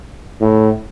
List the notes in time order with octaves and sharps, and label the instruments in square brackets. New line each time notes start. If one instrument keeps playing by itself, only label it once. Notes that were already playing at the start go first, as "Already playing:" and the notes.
[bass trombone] A2